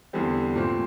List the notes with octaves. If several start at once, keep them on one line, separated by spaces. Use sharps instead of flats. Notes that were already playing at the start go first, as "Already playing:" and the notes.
E2 D3 G3 C4
A#2 A3 C4